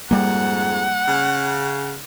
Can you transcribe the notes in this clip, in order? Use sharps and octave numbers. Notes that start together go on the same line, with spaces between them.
F2 G#2 G3 A#3 F#5
C#3